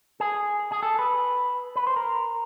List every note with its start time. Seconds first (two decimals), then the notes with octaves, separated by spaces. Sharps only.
0.20 G#4
0.72 G#4
0.83 A4
0.99 B4
1.76 B4
1.87 C5
1.96 A#4